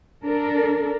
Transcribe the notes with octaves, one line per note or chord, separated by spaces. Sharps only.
D4 A4 A#4